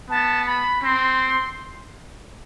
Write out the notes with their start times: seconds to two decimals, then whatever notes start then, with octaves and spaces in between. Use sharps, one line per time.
0.10 B3 A5
0.47 B5
0.83 C4 C6